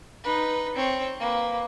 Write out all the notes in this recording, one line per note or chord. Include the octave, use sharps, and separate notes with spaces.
D#4 B4
C4 C#5
A#3 B4